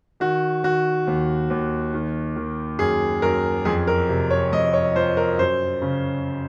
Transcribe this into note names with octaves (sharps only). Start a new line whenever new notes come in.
D#3 F#4
D#3 F#4
D#2
D#2
D#3
D#3
F#2 G#4
F#2 A#4
F2 G#4
A#4
C3
C#5
F2 D#5
C#5
F3 C5
A#4
F#2 C5
C#3